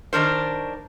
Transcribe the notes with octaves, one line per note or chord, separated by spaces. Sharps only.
D#3 D4 A#4 C5